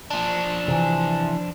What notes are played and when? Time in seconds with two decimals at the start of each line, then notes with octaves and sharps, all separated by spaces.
0.10 F3 D4
0.68 C3 E3